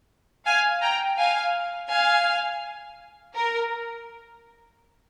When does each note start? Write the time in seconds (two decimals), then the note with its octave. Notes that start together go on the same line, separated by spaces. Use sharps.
0.46 F5 G#5
0.82 G5 A#5
1.18 F5 G#5
1.90 F5 G#5
3.35 A#4